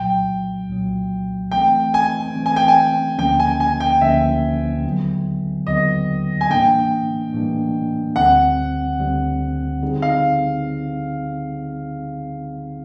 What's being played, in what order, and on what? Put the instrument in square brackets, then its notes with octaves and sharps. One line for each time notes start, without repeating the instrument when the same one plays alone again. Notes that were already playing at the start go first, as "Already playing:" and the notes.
Already playing: [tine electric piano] C2 A#2 F#3 [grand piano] G5
[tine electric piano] C2 A#2 F#3
[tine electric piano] E3 A3 C4 [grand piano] G5
[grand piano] G#5
[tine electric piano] E3 A3 C4
[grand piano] G#5
G5
G#5
[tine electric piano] D2 D3 F3 A#3 C#4 [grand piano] G5
[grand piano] G#5
G#5
G5
[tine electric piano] D2 D3 F3 A#3 C#4 [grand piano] E5
[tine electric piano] D#2 D3 F#3 B3
[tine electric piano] D#2 D3 F#3 B3 [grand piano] D#5
[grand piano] G#5
[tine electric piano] A2 E3 G3 A#3 D4 [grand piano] G5
[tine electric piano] A2 E3 G3 A#3 D4
[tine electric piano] D2 D3 G3 C4 [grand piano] F#5
[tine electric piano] D2 D3 G3 C4
D3 G3 C4 D#4 G#4
[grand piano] F5